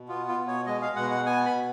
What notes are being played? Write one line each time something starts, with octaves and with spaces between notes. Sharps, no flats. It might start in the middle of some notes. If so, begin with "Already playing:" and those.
Already playing: B2
B3 F4
F4
B2
C#5
G#3 D#5
F5
B2 F#5
F#5
B3 G#5
B5
B2